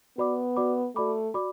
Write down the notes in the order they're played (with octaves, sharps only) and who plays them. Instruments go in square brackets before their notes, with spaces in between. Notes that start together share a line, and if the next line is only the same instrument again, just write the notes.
[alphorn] B3 [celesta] F#4 B4 D5 B5 D6
[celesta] F#4 B4 D5 B5 D6
[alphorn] A3 [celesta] F#4 D5 B5 D6
[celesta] F#4 D5 B5 D6